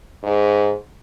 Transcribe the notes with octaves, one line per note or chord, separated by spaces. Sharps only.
G#2